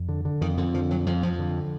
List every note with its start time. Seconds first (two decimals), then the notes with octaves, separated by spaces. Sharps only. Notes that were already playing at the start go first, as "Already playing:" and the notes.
Already playing: F2
0.09 D3
0.25 D3
0.41 F2 D#3
0.57 F2 D3
0.74 D3 F3
0.91 F2 F#3
1.06 F2 F3
1.23 F2 F3
1.39 D3